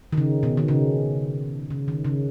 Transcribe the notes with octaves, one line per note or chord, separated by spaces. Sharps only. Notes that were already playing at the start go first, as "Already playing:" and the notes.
D#3
C#3
B2
D#3
C#3
C#3
D#3
C#3